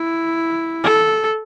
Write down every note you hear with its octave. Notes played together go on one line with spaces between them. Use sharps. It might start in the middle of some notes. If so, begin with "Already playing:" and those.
Already playing: E4
A4